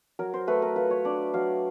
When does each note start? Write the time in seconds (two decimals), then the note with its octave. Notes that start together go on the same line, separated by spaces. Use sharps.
0.19 F#3 A#4
0.34 C5
0.48 A3 B4
0.62 A#4
0.76 F4 B4
0.91 C#5
1.05 D4 D5
1.34 F#3 F5